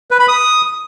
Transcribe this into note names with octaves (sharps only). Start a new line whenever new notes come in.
B4
B5
D#6